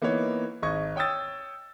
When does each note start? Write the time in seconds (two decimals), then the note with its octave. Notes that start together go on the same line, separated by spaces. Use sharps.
0.02 E3 A#3 B3 D#4 C#5
0.62 G#1 D#5 C#6 G#6
0.96 C#5 G5 D#6 E6 A6